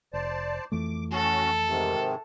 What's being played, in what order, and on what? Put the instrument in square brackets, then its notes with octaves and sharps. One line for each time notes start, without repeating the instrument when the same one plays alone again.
[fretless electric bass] F1 [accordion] C5 D5 A5
[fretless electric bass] F2 E3 A3 [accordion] D6
[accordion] C#4 F#4 [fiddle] A4
[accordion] G#2 C3 D#3